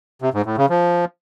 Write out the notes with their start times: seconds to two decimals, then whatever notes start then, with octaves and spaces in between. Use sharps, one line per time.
0.22 C3
0.34 G#2
0.46 A2
0.58 C#3
0.70 F3